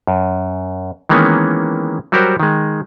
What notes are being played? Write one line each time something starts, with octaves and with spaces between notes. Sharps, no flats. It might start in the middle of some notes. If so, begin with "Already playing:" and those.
F#2
D#3 E3 G#3 A#3 B3 C#4
F#3 G3 F#4 G4 A#4 C5
D#3 G#3